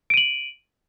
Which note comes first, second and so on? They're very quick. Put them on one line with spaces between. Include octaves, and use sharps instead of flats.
D7 D#7 F#7